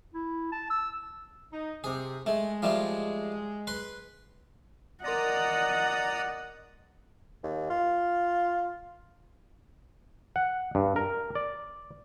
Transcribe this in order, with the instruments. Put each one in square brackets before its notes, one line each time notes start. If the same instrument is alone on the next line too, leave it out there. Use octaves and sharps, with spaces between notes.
[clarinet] E4
A5
E6
[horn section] D#4
[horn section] C3 [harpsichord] G#4
[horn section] G#3 [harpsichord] A3
[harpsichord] F3 G3 A3
B4 C6
[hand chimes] A#4 C6 A#6 [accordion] D5 A#5 D#6 [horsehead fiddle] D#5 F#5
[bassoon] D#2
F4
[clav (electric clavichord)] F#5
G2
A#4
D5